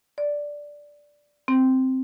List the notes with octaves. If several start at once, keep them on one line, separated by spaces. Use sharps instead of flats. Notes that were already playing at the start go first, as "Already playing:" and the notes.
D5
C4